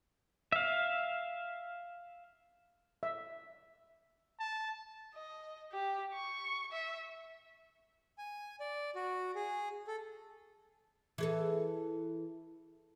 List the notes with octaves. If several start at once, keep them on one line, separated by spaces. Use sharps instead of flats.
E5 F5
E5
A5
D#5
G4
C#6
E5
G#5
D5
F#4
G#4
A4
E3 G#4 A4